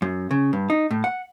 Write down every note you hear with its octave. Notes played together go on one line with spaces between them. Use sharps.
F#2
C#3
G2
D#4
A2
F#5